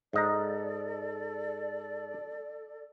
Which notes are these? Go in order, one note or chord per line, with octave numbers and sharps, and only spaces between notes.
G#2 A4 D5 D#5 A#5